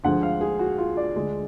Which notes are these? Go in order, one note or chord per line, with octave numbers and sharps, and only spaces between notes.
D2 D3 F3 G#3 F#5
F5
G#4
F#4
F4
D5
D2 D3 G#3